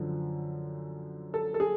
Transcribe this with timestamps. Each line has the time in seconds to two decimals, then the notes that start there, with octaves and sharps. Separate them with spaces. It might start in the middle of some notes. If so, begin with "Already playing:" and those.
Already playing: F#2 D3 F3
1.34 A4
1.54 A4
1.60 G#4